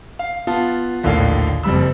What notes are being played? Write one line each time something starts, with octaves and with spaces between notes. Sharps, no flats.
F5
B3 F4 A5
A#1 D#2 A2 D3 F5
F#1 F2 G3 B5 E6